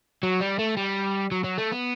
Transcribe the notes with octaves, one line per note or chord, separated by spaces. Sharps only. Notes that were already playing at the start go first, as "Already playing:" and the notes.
F#3
G3
A3
G3
F#3
F#3
A3
B3